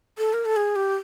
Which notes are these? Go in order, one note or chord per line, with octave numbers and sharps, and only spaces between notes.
A4
A#4
A4
G#4
G4